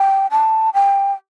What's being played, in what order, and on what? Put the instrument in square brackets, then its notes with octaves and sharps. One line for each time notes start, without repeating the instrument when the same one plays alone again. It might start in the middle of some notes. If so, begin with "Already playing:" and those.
Already playing: [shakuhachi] G5
A5
G5